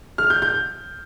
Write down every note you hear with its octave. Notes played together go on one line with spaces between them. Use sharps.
F6
G6
G6